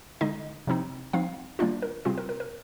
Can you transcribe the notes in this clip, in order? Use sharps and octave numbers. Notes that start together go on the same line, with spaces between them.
D3 G#3 D#4 D#5
C3 F3 C4 D#4
F3 C4 D#4 F5
D#3 G3 A#3 D4 F4 D5
A#4
C3 G3 C4 F4 G#4
A#4
A#4
A#4